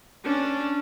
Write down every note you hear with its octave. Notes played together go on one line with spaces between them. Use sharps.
C#4 D4